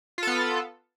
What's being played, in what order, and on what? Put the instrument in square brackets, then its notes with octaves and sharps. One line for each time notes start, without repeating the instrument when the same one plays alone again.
[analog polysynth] F4
A4
B3